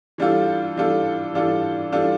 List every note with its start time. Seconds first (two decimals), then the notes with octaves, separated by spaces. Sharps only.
0.18 E3 G3 D4 F4 A4
0.76 E3 G3 D4 F4 A4
1.34 E3 G3 D4 F4 A4
1.92 E3 G3 D4 F4 A4